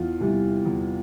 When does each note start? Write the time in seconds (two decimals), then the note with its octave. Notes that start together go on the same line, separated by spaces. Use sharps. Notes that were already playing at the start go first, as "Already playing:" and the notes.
Already playing: E2 F4
0.20 C3 E3 G3
0.66 E2